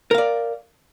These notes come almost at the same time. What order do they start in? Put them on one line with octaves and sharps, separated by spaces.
A#4 F5 D5